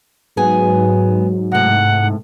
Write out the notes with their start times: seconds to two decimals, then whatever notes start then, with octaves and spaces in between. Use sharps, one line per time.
0.37 G#2 F#3 B3 G#4 G#5
1.52 A2 C3 F#5